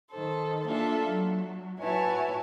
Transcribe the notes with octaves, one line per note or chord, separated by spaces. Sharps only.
D#3 A4 C5
A#3 D4 F4 A4 E5
F#3
E4 F#4 B4 C#5 G#5 A5